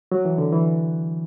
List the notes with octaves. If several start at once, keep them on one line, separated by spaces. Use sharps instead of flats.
F#3
E3
D3
E3